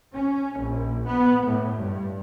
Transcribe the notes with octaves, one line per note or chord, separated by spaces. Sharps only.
C#4
A#1
B3
A2
G2